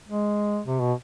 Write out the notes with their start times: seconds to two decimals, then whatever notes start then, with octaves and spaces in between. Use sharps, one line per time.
0.09 G#3
0.66 C3
0.80 B2